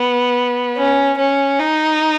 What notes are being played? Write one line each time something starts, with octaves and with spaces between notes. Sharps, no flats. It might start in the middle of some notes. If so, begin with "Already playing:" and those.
Already playing: B3
C#4
C#4
D#4